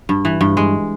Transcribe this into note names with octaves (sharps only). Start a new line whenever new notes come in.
G2
E3
G2
G#3